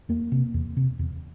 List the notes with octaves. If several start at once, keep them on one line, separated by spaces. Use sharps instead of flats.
E2 A#3
C3
E2
C3
E2